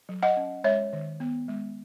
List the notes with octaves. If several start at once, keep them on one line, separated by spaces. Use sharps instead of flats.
F#3
D#5 F#5
C#4
G#3 C#5 E5
D#3
B3
G#3